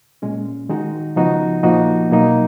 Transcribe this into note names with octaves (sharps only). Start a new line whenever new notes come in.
A#2 G#3 C#4
D#3 G#3 D#4 F#4
C#3 F3 B3 D#4 F#4
A#2 F3 A#3 D#4 F#4
B2 F#3 A#3 D#4